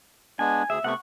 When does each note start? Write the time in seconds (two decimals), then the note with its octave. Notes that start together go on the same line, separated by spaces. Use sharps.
0.39 G#3 B3 D4 G#5
0.70 D2 G#4 E5
0.84 C3 A3 B3 F#5 C#6